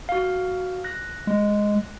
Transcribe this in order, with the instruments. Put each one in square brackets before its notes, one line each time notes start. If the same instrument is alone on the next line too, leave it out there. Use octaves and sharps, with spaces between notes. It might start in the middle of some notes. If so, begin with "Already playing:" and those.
[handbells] F#4 F5
F#6 A#6
[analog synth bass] G#3